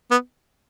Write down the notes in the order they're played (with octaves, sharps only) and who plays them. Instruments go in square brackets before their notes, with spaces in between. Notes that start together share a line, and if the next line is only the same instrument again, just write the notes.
[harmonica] B3